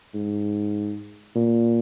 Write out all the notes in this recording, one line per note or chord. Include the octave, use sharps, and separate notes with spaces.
G#2
A#2